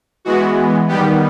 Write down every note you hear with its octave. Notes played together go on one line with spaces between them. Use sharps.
E3 G#3 B3 F#4
D#3 G3 B3 G4